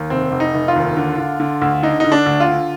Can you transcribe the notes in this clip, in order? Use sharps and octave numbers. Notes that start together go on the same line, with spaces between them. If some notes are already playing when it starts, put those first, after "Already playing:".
Already playing: D#2
F1 C4
F1
D#4
F1
F4
D#2
D3
D3
D3
D2
D3 D#4
D3 D#4
D4
D2
F4
D3